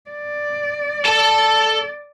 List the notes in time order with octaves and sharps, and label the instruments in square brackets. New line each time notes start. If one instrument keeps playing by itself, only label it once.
[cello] D5
[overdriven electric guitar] A4 A5